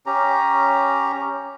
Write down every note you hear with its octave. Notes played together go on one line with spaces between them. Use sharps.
C#4 G4 A#5